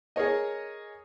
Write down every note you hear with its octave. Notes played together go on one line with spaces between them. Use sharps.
G#4 A#4 C#5 D#5